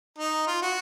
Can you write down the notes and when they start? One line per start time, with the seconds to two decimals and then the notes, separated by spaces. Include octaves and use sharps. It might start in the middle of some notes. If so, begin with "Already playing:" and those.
0.18 D#4
0.47 F4
0.62 F#4